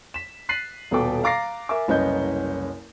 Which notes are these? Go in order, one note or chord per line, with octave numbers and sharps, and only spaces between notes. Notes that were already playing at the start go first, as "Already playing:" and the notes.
B6 E7
F#6 A6 B6 C7 D#7 F#7
D#1 B2 B3 A4 G5 D6
F5 A#5 D6 A6 A#6 C7
A#4 E5 G#5 D6
F#1 C2 C#4 B4 D#5 G6